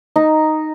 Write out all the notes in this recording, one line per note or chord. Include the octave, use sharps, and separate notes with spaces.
D#4